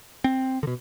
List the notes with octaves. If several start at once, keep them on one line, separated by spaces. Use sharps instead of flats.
C4
B2 D3